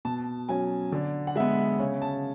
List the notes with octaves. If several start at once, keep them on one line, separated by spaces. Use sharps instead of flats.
B2 A5
F#3 C#4 G#5
D3 D5
F#5
G#3 B3 E5
C#3 C#5
A5